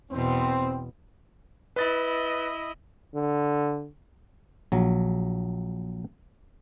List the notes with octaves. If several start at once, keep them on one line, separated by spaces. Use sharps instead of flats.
E2 B2 C4
E4 B4 D#5 A6
D3
A#1 F#3